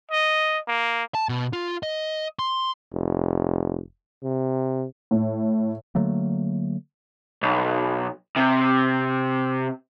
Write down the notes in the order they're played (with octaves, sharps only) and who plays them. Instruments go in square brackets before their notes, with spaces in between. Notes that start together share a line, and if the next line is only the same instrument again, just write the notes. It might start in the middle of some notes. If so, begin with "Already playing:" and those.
[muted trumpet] D#5
A#3
[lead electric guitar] A5
B2
F4
D#5
C6
[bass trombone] F1
C3
[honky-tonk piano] A2
[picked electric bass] D3 F#3 A3 A#3
[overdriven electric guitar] B1
C3